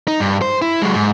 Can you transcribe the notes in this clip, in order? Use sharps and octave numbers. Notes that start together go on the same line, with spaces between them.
D#4
G2
C5
E4
F#3 G#3
G#2